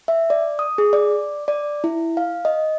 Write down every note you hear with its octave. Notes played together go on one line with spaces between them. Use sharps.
E5
D5
D#6
G#4
D5
D5
E4
F5
D#5